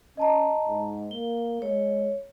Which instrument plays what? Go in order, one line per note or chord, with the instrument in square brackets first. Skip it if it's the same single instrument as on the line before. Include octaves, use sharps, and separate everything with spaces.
[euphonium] C#4 [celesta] D#5 A5 A#5
[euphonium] G#2
[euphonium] A#3 [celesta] G7
[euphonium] G#3 [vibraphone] C#5